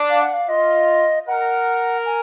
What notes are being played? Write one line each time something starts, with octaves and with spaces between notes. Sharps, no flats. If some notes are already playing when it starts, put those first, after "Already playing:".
Already playing: D4
F5
F#5
F5
F4 D#5
A#4 F#5
G#5